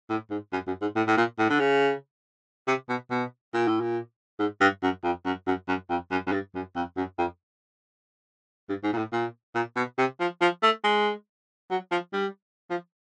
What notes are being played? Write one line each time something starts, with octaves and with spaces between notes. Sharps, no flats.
A2
G#2
F#2
F#2
G#2
A2
A2
A#2
A2
D3
C#3
C3
B2
B2
A#2
A2
A#2
G#2
G2
F#2
F2
F#2
F#2
F#2
F2
F#2
F#2
G2
F#2
F2
F#2
F2
G2
G#2
A#2
A2
A#2
A#2
B2
C3
F3
F3
A3
G#3
F#3
F3
G3
F3